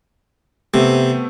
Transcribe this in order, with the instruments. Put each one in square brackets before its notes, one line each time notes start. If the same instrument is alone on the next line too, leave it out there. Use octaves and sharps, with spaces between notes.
[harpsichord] C3 [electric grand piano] A3 B3 C4